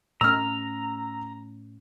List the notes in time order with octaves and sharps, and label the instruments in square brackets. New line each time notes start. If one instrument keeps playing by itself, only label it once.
[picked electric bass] A2 A3 C#4 [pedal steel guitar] A#5 [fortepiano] E6 F6